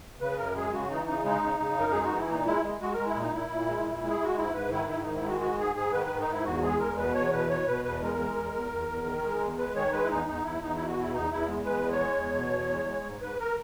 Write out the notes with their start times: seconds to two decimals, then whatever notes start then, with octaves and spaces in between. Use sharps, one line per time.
0.20 C#3 B4
0.38 F#2 A#4
0.55 G#3 G#4
0.72 C#3 F#4
0.90 E3 D#4
1.07 C#3 D#4
1.24 G#3 D#4
1.43 C#3
1.60 C#3
1.77 F#2 A#4
1.92 G#3 G#4
2.04 F#4
2.11 E3
2.17 E4
2.28 A#2 D#4
2.46 G#3 E4
2.63 G#3
2.81 G#3 F#4
2.93 A#4
2.99 G#3
3.07 E4
3.15 A#2
3.21 D#4
3.33 A#2 E4
3.51 A#2
3.67 G#3
3.86 A#2
4.03 G#3
4.10 G#4
4.20 G#3 F#4
4.38 G#2 E4
4.54 G#2 B4
4.71 D#3 E4
4.89 G#2 E4
5.02 D#4
5.07 D#3
5.16 E4
5.24 G#3 F#4
5.41 G#2 F#4
5.59 G#2 G#4
5.75 G#2 G#4
5.93 D#3 B4
6.06 G#2 B4
6.20 D#4
6.28 G#2 E4
6.45 E2 F#4
6.62 G#3 G#4
6.80 E2 A#4
6.98 B2 B4
7.15 E2 C#5
7.33 B2 B4
7.50 B2 C#5
7.67 B2 B4
7.85 E2 B4
8.01 G#3 A#4
8.18 G#3
8.36 E2
8.53 E2
8.71 E2
8.88 E2
9.06 D#3
9.23 G#3
9.40 E2
9.58 G#3 B4
9.75 D#3 C#5
9.93 G#3 B4
10.03 E4
10.10 E2 D#4
10.27 E2 D#4
10.44 E2 E4
10.61 E2 D#4
10.75 B2 E4
10.88 F#4
10.97 E2 E4
11.14 E2 D#4
11.31 E2 E4
11.48 G#3
11.65 E2 B4
11.83 G#3
11.92 C#5
12.00 G#3
12.18 E2
12.35 B2
12.53 E2
12.70 G#3
12.87 G#3
13.04 G#2
13.22 G#2 B4
13.40 A#4